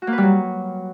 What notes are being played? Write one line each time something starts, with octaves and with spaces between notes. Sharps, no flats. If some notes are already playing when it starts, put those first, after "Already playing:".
F#4
A#3
B4
G3
F#3